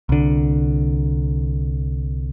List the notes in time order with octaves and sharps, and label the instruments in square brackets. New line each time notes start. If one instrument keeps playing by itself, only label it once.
[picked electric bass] C2 D3